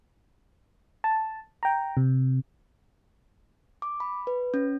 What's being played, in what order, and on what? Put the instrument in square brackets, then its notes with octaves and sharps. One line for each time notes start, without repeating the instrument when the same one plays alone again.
[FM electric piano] A5
G5 A#5
C3
[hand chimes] D6
B5
B4
C#4